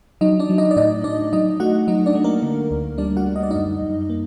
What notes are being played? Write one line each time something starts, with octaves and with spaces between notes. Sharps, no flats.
F#3 D#4 D#5
D4 D5
F#3
D#4 D#5
D5
A2 D#4 D#5
A2 D4 D5
F#3 D#4 D#5
A3 F#4 F#5
F#3 D#4 D#5
D4 D5
A3
A#3 A#4
D3
D2
G3 D4 D5
F#4 F#5
G3
D#5
D5
F#2 D#4 D#5
F#2
A#3